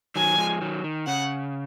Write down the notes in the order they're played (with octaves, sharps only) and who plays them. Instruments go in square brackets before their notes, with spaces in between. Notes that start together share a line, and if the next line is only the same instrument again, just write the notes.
[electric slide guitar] D#3 F#3 [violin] G#5
[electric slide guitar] F3 G#3
D#3 F#3
D#3
[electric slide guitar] C#3 [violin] F#5